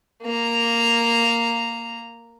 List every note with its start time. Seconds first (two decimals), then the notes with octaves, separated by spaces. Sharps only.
0.22 A#3 A#5